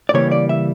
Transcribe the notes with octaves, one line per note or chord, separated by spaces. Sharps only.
D5
C#3 E3 G3 A#3 C#5
D5
E5